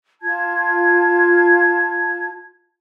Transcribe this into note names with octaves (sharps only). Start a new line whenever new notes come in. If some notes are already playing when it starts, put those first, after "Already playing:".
F4 A5 G#6